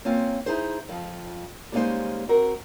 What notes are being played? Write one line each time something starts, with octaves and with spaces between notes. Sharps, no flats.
A#3 C4 C#4 F4
D#4 E4 G#4 C5
F2 F3
G3 G#3 A#3 C#4 D#4 C5
C4 F#4 A#4